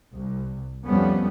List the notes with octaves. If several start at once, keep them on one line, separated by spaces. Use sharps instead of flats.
C2
F2 F3 G3 A3 B3 C#4